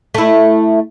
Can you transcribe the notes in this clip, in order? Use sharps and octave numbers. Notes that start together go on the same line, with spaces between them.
A3 E4